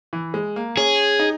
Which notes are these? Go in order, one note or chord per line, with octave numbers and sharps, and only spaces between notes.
E3
G#3
A#3
C#4 G#4
D#4